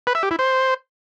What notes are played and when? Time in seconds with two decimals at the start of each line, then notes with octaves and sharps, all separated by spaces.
0.07 B4
0.15 E5
0.23 G4
0.31 E4
0.39 C5